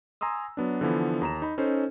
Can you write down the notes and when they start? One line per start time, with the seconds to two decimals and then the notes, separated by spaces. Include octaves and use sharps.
0.21 G#5 A#5 C6 D#6 E6
0.57 F#3 B3 D4
0.81 D3 E3 F3 B3
1.21 D#2 A#5 E7
1.42 D#4 B5
1.58 C#4 D#4 A4 C5